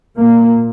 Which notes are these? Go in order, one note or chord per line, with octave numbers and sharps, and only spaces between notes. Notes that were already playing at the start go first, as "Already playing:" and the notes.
A#2 A#3